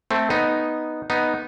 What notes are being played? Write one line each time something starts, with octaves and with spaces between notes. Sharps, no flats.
A3 C4
B3 D#4
B3 D#4